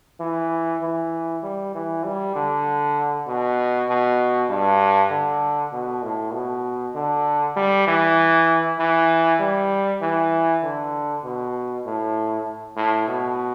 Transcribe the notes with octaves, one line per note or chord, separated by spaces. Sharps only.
E3
E3
G3
E3
G3
D3
B2
B2
G2
D3
B2
A2
B2
D3
G3
E3
E3
G3
E3
D3
B2
A2
A2
B2